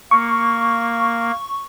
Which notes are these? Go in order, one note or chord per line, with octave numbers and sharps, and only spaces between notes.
A#3 C#6